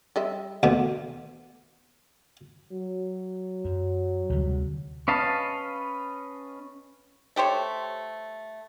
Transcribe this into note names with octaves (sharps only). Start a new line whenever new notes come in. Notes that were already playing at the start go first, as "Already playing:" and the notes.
G3 D#5 E5
D2 B2 B3
F#3
F#2
D2 C3 G3
C#4 B4 D#5 F5 A5
A3 G4 C5 C#5